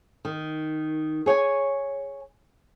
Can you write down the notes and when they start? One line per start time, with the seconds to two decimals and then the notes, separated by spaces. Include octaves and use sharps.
0.25 D#3
1.26 G#4 C#5 G5 G#5